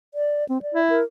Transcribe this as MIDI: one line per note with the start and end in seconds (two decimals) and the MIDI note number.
0.14 0.47 74
0.49 0.62 60
0.62 0.81 74
0.74 0.99 64
0.90 1.03 70